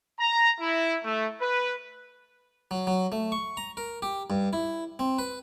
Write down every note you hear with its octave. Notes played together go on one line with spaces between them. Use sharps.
A#5
E4
A3
B4
F#3
F#3
A3
C#6
A#5
A#4
G4
G2
E4
C4
B4